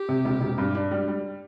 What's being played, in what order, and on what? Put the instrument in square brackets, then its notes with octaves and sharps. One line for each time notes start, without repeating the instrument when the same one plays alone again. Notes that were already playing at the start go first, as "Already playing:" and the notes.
Already playing: [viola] G4
[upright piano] C3
E1
E1
G2
D4
G3
G3